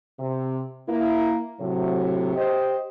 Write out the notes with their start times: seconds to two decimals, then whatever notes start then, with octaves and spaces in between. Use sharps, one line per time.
0.20 C3
0.89 A#3 E4
1.61 A2 C3 F#3
2.36 G4 C5 D#5